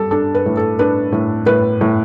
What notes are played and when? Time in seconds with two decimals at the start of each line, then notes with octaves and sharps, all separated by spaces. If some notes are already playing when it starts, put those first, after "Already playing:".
Already playing: G3 A4
0.11 D4 A4
0.35 B4
0.46 A2
0.57 A4
0.79 D4 B4
1.12 A2
1.46 A2 B4
1.81 A2